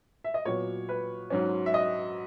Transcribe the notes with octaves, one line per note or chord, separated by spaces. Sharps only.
E5
D#5
A#2 F#3 B3 C#5
B4
G#2 F#3 C#4
E5
D#5